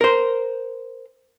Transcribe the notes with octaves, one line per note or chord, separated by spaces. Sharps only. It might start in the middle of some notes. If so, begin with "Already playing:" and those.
A#4 C5